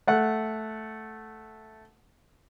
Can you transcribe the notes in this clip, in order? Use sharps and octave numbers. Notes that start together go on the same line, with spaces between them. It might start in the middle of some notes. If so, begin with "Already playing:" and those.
A3 F#5